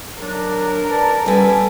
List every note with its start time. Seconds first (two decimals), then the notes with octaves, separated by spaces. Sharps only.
0.21 F#3 D4 A#4
0.90 B4 D5 A5
1.26 G3 B3 C#4 A4 G#5